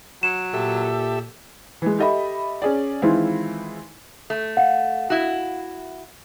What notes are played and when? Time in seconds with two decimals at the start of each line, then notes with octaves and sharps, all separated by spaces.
0.23 F#3 E7
0.54 A#2 G4 A4 E5
1.82 E3 G#3
1.99 G4 A4 D#5 E5 B5
2.62 C#4 G#4 D5
3.02 D#3 E3 G#3 C4 E4 F4
4.30 A3
4.57 F5 F#5
5.10 E4 F#4